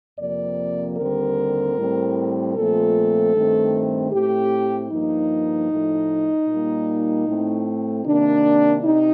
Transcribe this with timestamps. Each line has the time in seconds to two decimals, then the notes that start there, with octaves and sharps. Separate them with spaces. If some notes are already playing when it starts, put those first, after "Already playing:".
0.19 F2 C3 F3 A#3 D5
0.98 D#2 D3 G3 C4 A#4
1.77 A2 G3 C4
2.55 A#2 F3 A3 C4 A4
3.33 G2 D#3 A3 C4
4.12 A2 A3 C4 G4
4.90 G2 F3 A#3 D#4
5.69 A2 F3 A3
6.47 A#2 G3 A#3
7.27 A2 A3 C4
8.05 C3 D#3 A#3 D4
8.83 C3 D#4